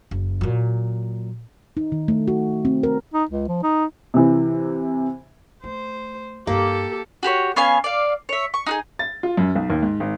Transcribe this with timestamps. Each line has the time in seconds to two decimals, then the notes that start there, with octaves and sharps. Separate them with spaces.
0.11 F#1
0.41 A#2 F#3
1.77 D#4
1.92 D#3
2.08 A3
2.28 F#4
2.65 C4
2.83 A#4
3.13 D#4
3.30 C#2
3.48 F3
3.63 D#4
4.14 C3 E3
5.64 A3 C5
6.47 G2 A#3 D#4 G4 A4
7.23 F#4 G4 A#4 C#5
7.56 B3 C#4 F5 G#5
7.84 D5 F5
8.29 C#5 E5
8.54 C#6
8.66 D#4 F#4 G#4
8.99 A6
9.23 F4
9.37 F#2
9.55 B1
9.70 D#2
9.83 G#2
10.00 G#1